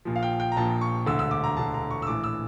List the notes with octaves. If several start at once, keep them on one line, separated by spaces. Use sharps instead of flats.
A#1 A#2 F3
F5
G5
G5
A#5
A#1 A#2 F3 A5
C#6
E1 D2 D3 E6
E6
D6
A#5
E1 D2 D3 A5
A#5
C#6
E6
A#1 A2 E3 D6
E6